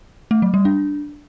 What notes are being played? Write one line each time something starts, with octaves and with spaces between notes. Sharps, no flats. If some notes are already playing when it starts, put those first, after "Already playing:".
A3
F#3
G3
D4